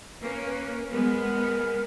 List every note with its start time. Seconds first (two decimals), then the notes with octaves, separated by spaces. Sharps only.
0.22 A#3 C#4 B4
0.45 B4
0.68 A#4
0.90 G#3 B3 A#4